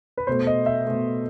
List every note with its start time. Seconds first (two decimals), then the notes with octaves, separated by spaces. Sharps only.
0.17 B4
0.27 B2 A3 C5
0.47 D#5
0.66 E5
0.86 B2 A3